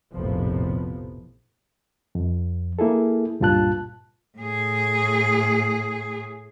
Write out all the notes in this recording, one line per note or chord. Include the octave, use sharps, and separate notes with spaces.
F1 A#1 A2 C3 F3 B3
F2
A#3 E4 G#4 A4
C#2 G2 A#2 F4 A5 F#6
A2 G#4